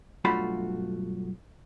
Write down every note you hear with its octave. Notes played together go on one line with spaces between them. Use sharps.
B1 G2 A3 F4 F#4 B5